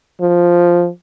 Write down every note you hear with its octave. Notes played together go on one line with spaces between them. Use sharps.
F3